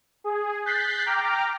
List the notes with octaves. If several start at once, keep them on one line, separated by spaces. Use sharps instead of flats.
G#4
F#6 G6 A6 B6 C7
G5 A#5 D6 F6